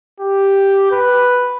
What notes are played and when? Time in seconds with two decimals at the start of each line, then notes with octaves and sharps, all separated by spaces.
0.20 G4
0.91 B4